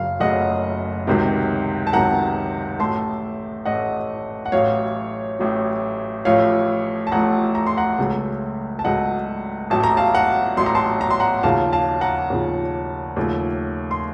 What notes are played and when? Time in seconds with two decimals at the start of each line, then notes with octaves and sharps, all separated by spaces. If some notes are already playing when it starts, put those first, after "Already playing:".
Already playing: F#1 F#2 C#3 F5
0.20 F#1 F#2 C#3 A3 D#5 F#5
1.07 C#2 C3 D#3 F#3
1.87 A5
1.93 C#2 C3 D#3 F#3 F#5 A#5
2.79 A1 A2 A3 A5 C6
3.65 A1 A2 A3 D#5 F#5
4.46 F#5
4.52 A1 A2 F#3 C#5 F5
5.39 A1 A2 F#3
6.25 A1 A2 F3 A3 C#5 F5
7.07 A5
7.12 A1 A2 F3 A3 F#5 A#5
7.55 A#5
7.67 C6
7.77 F#5 A#5
7.98 C#2 C#3 F#3 A3
8.79 A5
8.84 C#2 C#3 F#3 A3 D#5 F#5
9.70 A1 A2 F#3 A5
9.84 A#5
9.97 F5 A5
10.15 F#5 A#5
10.57 A1 A2 F#3 C6
10.66 A#5
10.75 A5 C6
11.01 A#5
11.11 C6
11.20 F#5 A#5
11.43 D#2 C#3 F3 F5 A5
11.72 F5 A5
12.01 F#5 A#5
12.30 D#2 C#3 F3
13.16 D#2 C#3 F3 A3
13.91 C6